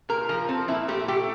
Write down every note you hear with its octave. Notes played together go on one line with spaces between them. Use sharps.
A#2 A#4
F3 A#4
C4 A4
A#2 E4
A3 G4
A3 G4